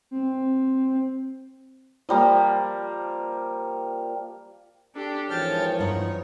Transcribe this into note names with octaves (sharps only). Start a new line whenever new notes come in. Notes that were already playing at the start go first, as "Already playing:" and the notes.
C4
F3 G3 A#3
D4 G4 A4
G#1 E3 F3 C#5 G5 A5 F6
G2 D#4 F4 F#5